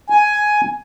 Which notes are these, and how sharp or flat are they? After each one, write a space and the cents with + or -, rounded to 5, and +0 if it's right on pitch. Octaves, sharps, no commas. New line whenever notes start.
G#5 +10